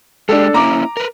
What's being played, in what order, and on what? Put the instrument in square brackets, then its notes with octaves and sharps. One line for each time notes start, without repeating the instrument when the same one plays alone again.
[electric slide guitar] G#3 G4 [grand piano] D4 A4
[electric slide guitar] A#3 C#4 E4 [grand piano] A#5 D6
[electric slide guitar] A#4 B4